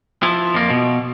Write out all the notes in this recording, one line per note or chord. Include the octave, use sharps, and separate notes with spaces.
F3 E4
F2 A#3
B2